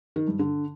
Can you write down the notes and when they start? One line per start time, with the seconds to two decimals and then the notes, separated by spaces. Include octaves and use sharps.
0.16 D#3
0.28 G2
0.39 D3